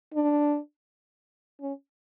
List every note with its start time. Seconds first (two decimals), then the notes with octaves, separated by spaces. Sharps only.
0.14 D4
1.61 C#4